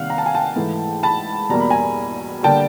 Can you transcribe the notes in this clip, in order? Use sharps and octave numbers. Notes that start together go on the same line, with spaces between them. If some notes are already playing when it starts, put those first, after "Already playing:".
Already playing: C3 D#3 G3 A#3 F5 F#5
A#5
A5
G#5
G5 A5
G#2 E3 A3
A5 B5
E2 B2 G3 A#3 A#5
B5
G#5 A#5
D3 G3 A#3 G5 A5